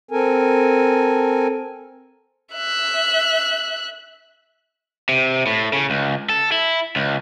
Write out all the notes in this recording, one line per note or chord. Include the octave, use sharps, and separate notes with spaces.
C4 A4 A#4 G#5
E5 F#6
C3
A2
C#3
C#2
A4
E4
C#2